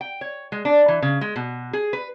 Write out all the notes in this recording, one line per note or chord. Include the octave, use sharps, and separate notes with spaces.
G5
C#5
G#3
D4
E3
C#3
G#3
B2
G#4
B4